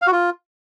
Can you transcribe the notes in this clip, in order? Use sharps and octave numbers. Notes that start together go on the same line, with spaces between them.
F5
F#4
F4